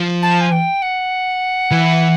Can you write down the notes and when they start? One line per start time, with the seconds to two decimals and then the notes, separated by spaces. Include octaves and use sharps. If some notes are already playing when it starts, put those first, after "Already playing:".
Already playing: F3
0.22 A5
0.40 G#5
0.51 G5
0.82 F#5
1.71 E3